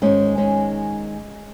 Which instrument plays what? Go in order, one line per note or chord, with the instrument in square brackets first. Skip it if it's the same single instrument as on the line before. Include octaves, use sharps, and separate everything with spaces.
[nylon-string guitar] G#2 D#3 G#3 C#4
G#3 C#4